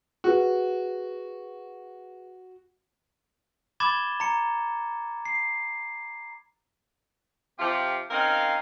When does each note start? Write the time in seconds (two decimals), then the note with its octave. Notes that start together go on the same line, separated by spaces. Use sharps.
0.24 F#4 G#4 B4
3.80 B5 D6 G#6 A6 E7 G7
4.20 A#5 C#7
5.25 C7
7.59 C3 F3 F4 G4
8.11 C4 C#4 D#4 A#4 F5